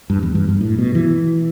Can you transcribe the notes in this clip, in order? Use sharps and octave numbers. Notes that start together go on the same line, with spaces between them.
G2
E2
G2
G2
A2
B2
E3